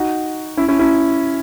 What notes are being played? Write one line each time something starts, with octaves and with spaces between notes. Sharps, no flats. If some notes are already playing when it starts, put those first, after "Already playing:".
Already playing: D#4 F#4
C#4 E4
C#4 E4
C#4 E4